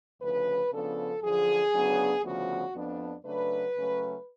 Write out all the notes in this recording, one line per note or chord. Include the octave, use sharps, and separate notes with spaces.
D2 C#3 F3 B4
C#3 F3 B3 D4 A4
F#2 D3 F3 G#4
D2 C#3 F#3 B3 D4
D2 C#3 F3 B3 F#4
F2 F3 B3 D4
C#3 F#3 A3 D4 B4
C#3 F#3 A3 C#4